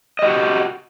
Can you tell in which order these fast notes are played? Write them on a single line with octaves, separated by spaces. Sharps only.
D#5 G4 F#4